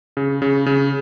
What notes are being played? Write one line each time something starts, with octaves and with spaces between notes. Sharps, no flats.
C#3
C#3
C#3